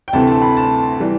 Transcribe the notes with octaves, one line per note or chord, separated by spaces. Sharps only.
G5
D2 C3 E3 A3 C4 A5
A5
B5
A5
E3 G3